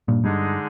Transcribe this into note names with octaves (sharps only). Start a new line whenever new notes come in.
G2 A#2
G2 D3 G#3 D#4 G#4